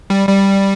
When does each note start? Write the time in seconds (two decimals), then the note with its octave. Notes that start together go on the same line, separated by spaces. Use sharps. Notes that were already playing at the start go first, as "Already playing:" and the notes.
0.10 G3
0.29 G3